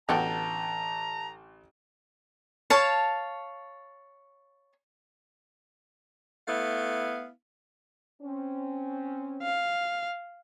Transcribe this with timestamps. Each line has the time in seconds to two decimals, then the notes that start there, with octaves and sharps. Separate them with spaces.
0.09 A1 D3 B3 F#4 A4 G5 A5 A#5
2.70 C#5 F5 A5
6.48 A3 B3 E4 F5
8.22 C4 C#4
9.42 F5